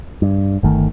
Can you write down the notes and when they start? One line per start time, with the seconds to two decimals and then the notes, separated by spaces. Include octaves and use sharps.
0.22 G2
0.63 G1 D#3 A3